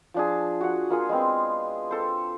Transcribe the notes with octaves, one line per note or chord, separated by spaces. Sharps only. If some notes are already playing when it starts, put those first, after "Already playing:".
F3 D4 G#4
F#4 F#5
A#3 F4 G#4
G#3 B3 C4
A4 C5